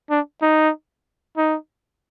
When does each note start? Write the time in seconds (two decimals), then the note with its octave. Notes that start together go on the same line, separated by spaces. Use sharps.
0.10 D4
0.42 D#4
1.37 D#4